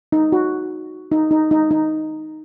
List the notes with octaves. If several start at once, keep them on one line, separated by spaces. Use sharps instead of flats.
D#4
F#4
D#4
D#4
D#4
D#4